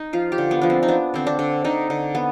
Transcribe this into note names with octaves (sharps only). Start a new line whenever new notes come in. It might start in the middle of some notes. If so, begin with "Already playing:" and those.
Already playing: D#4
F3 F4
G4
D3
B3
F3 D4
C4
D#4
B3 D4
D3 C4
D4
D3
D3 D#4
D3
B3